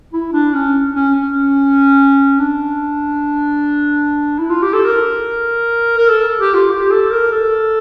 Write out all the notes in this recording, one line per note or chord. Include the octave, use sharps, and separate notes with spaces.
E4
D4
C#4
C#4
C#4
D4
E4
F4
G4
A4
A#4
A#4
A4
G4
F4
G4
A4
A#4
A4